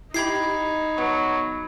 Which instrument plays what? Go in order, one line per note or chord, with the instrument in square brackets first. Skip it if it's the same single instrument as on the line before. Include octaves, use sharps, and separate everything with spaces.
[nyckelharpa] D#4 [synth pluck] E4 G4 [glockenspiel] B5 G#6 C7
[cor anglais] F#3 [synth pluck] B3